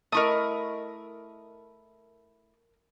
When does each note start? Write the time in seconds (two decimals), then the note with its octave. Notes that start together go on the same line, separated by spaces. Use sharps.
0.12 A3 E4 A#4 D#5 C#6 D#6